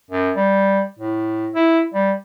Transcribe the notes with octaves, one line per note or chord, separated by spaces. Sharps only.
F#2
G3
A2
E4
G3